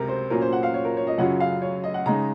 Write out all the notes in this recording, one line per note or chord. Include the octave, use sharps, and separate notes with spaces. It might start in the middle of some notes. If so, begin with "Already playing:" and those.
Already playing: C#2 C3 F#3 A#4
C5
A#2 F#3 C#4 F4 A#4
C5
F#5
F5
C#5
A#4
C#5
D#5
F#2 C#3 F#3 C#4 F4 F#5
F5
C#5
D#5
F#5
C#3 G#3 D#4 A#5